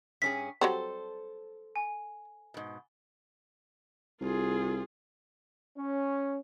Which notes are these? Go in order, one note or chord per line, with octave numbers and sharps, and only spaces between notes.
G2 C#4 G#4 B6
F#3 G3 C4 A4 C5
G#5
G#2 B2
C2 F4 G#4
C#4